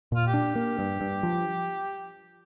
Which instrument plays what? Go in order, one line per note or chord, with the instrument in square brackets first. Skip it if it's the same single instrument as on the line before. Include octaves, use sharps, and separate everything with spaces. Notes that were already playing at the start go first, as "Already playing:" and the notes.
[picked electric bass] A#2 [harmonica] F4
[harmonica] G4
[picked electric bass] D4
A#3
G2
G2
F3